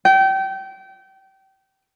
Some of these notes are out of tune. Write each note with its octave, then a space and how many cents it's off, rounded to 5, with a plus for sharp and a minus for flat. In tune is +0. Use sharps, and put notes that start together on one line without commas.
G5 -30